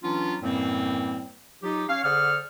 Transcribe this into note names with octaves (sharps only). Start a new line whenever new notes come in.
E3 F#3 B3 C#4 D4 F4
F#2 A2 E3 G3 A#3 C4
F#3 D#4 F4 G4
C#4 C#5 F5
D3 G#4 C5 D5 F#5 F6